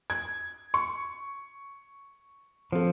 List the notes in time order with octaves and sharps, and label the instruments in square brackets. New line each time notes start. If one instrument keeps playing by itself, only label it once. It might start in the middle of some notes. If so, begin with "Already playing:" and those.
[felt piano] G#6
C#6
[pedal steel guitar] F3 [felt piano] C4 A4